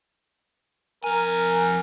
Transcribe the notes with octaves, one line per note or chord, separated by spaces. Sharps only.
F2 A#4 G#5